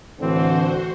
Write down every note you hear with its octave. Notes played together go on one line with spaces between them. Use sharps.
A2 D3 E3 C4 F#4 C5